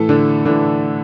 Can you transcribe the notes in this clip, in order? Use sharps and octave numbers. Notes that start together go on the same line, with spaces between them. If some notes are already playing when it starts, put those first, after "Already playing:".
Already playing: A2 E3 A3 A4
D3 D4
A2 D3 E3 D4